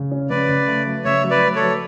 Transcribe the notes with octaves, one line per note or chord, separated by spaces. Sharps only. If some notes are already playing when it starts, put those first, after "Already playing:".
Already playing: C#3
C#4
C#3 B4 D5
C#3
A3
F#3
C#3 C#5 E5
F#3
B4 D5
A3
A4 C#5
F#3